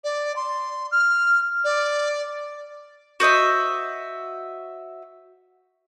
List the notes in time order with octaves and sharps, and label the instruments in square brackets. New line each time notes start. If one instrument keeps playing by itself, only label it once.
[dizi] D5
C6
F6
D5
[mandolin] F#4 C5 D#5 E5